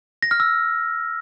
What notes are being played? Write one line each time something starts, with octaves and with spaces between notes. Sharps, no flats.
A#6
F6
E6